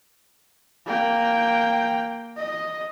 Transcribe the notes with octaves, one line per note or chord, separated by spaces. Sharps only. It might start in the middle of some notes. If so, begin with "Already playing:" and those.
A#3 G5
D#5